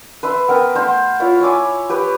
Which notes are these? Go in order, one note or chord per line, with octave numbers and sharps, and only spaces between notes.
B4 C5 E5
B3 A#4 G5
A3 C5 F5 F#5
E4 F4 C#5
C#5 E5 G#5 D6
G4 B4